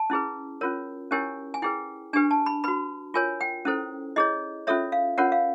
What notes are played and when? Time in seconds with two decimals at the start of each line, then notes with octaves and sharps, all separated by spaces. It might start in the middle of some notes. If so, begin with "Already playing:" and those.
Already playing: A5
0.10 C#4 E4 G#4 B4
0.61 C#4 F4 A#4 C#5
1.11 C#4 E4 G4 A#4 C#5 G#5
1.54 G#5
1.62 E4 G#4 B4 G5
2.13 D4 G4 B4 G#5
2.31 A5
2.46 B5
2.64 F#4 B4 B5
3.14 F4 A#4 C#5 G#5
3.41 G5
3.65 C#4 E4 A4 C5
4.16 E4 G#4 C#5 D#5
4.67 C#4 F4 A4 C#5 E5
4.92 F5
5.18 C#4 F4 A#4 C#5 F#5
5.32 F5